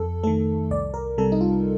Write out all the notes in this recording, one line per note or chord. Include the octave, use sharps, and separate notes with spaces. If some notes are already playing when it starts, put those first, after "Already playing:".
Already playing: F2 A4
D#3 A3 A4
C2 D5
A#4
C3 G3 A4
D#4
F4